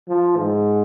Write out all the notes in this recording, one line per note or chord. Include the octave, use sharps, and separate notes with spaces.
F3
G#2